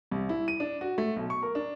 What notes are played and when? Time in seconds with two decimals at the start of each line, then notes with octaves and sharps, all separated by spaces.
0.11 C2
0.29 E4
0.48 D#7
0.60 D4
0.81 F#4
0.98 A3
1.16 B1
1.30 C#6
1.43 A#4
1.55 D4